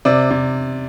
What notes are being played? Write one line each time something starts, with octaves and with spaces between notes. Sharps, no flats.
C3 D5
C3